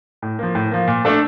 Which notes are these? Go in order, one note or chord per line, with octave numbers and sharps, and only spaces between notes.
A2
F3 A#3
A2
F3 A#3
A#2
A3 D4 A4